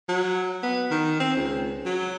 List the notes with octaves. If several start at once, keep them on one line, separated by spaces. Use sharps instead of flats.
F#3
B3
D#3
C4
C#2
F#3